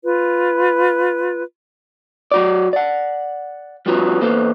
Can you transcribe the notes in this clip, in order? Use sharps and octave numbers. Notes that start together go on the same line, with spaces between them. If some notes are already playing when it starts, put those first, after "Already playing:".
F4 B4
F#3 F#4 D5
D5 F#5
F3 G3 B3 C#4 F4 F#4
E2 A#3 A4 B4 C5